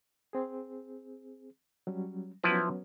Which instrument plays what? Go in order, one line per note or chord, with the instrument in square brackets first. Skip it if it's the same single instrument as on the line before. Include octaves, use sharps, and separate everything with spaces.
[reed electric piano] C4 G#4
F#3 G3 C#4
[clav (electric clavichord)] F3 E4 B4 [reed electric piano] F#3 B3 C#4